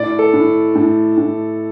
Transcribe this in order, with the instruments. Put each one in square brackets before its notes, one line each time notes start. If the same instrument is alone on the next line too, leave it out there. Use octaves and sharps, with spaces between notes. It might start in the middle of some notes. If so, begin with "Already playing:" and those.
Already playing: [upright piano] A2 [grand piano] D5
[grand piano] A4
[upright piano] A2
A2
A2